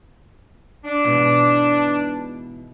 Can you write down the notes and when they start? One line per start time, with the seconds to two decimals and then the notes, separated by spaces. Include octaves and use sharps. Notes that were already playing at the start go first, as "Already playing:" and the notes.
0.84 D4
1.04 G#2 B2 E3